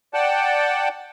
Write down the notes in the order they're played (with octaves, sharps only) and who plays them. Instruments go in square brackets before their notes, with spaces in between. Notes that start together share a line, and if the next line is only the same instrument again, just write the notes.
[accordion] D5 F#5 G5 A5